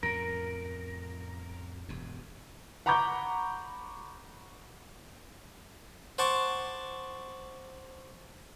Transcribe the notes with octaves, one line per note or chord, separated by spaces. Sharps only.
F2 A2 C#3 A#4
E1 G2
F#5 A#5 B5 C#6 D6 G6
C5 F#5 A5 C#6 D6